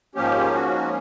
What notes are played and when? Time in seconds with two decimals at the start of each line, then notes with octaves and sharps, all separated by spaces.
0.15 G#2 F3 A#3 C#4 G4
0.55 F#4